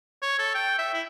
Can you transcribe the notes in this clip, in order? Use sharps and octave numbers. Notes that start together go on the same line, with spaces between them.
C#5
A4
G5
E5
E4